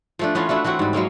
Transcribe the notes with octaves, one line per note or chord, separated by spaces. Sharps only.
F3 A3 D4
E3 B3 C#4 F4
A3 D4 E4 F#4
E3 A3 C4 F#4
G#2 G3
F#3 G#3 A#3 C#4